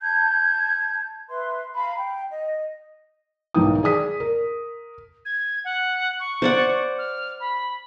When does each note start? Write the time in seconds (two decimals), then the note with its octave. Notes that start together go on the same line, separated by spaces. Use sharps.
0.01 A5 G6 G#6
1.29 B4 E5 C6
1.75 F5 A#5 B5
1.96 G5
2.31 D#5
3.54 B1 G#2 D#3 E3 G5 D#6
3.83 G#4 D5 D#6 B6
4.20 A#4
5.25 G#6
5.65 F#5
6.20 C#6
6.42 C5 D5 F#5
6.98 F6
7.40 B5